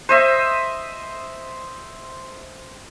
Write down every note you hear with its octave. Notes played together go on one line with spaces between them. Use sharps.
C5 D#5 E5